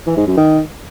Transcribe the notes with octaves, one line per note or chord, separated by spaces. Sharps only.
E3
G#2
F#2
D#3